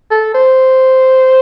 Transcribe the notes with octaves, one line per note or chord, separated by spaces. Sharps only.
A4
C5